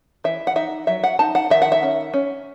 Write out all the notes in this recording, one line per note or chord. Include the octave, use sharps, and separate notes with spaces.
E3 E5
F#5
D#4 E5
F#3 E5
F#5
D#4 A5
F#5
D#3 E5
F#5
E5
C#4
C#4